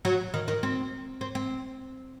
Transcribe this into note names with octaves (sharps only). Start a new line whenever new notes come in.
F#3
D#3
D#3
C4
C4
C4